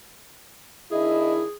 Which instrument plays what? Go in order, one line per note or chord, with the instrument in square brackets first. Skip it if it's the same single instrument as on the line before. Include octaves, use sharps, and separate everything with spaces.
[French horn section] D#3 D4 E4 [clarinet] G#4 [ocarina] D#5